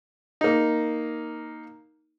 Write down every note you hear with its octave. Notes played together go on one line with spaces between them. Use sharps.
A#3 D#4